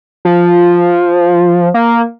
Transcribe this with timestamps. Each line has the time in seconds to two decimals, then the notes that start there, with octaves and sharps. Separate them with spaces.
0.25 F3
1.74 A#3